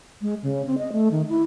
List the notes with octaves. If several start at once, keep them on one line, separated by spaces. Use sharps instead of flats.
G#3
C#3
C4
D#5
A3
D#3
E4